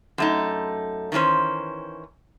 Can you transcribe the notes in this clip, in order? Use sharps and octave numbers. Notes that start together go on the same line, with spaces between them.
F#2 A3 D#4
D#3 E3 G3 C#4 C5